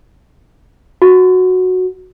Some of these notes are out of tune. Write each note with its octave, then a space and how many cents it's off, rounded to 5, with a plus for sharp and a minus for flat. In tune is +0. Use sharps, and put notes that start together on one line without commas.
F#4 -5